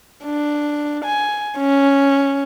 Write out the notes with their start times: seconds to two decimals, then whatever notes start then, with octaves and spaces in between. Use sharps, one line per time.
0.24 D4
1.04 G#5
1.58 C#4